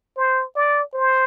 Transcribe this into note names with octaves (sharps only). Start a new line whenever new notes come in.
C5
D5
C5